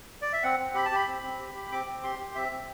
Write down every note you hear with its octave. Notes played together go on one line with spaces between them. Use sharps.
D5
E5
C4 F#5
C4
G4 B5
A5
G4 B5
C4
C4
G4
G4
C4 D6
C4
G4 C6
G4
C4 E5
C4